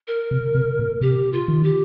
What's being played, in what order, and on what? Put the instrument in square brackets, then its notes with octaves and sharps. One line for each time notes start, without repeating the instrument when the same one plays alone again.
[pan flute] A#4
[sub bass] C3
C3
A#2
[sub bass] C3 [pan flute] G4
[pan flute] F4
[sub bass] D#3
[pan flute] G4